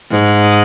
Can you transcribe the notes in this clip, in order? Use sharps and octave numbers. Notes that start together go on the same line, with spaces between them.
G#2